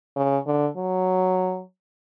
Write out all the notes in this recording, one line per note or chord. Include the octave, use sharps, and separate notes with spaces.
C#3
D3
F#3